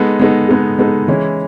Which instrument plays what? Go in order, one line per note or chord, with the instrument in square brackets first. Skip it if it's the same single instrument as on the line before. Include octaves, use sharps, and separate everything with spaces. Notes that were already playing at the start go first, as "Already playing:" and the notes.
Already playing: [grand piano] G#3 B3 D#4 A4
G#3 B3 D#4 A4
G#3 B3 D#4 A4
G#3 B3 D#4 A4
E3 G#3 C#4 E4